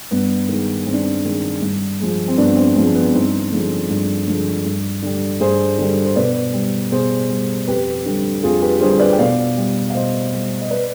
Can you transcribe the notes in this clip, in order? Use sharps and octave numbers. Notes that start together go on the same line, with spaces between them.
G2 B3
D#3 G#3
G2 C4
D4
C4
D#3 G#3
G2
F3 G#3
C4
G2 B3 D4
C4
F3 G#3 C4
B3
G2 C4 D#4
D3 F3 G#3
G2
D3 F3 G#3
G2
D3 G3
G2 G#4 C5
D3 G3
C5
B2 B4 D5
G3
B2 G#4 C5
G3
F2 G4 B4
D3 G3
F2 F4 G#4
G4 B4
D3 G3 G#4 C5
B4 D5
G5
B2 D5 F5
G3
F5
B2 C5 D#5
G3
D#5
B4 D5